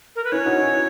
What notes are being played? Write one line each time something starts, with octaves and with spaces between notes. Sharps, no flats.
A#4
B4
C#4 E4 C#5
D#4 F#4
C#4 E4